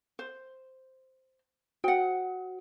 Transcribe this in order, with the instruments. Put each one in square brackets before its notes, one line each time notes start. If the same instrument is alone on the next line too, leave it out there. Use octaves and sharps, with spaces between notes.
[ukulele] C5
[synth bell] F#4 [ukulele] F#5 G5